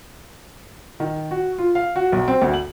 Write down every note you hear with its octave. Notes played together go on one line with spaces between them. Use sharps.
D#3
F#4
F4
F5
F#4
B1
C4
D2
F#7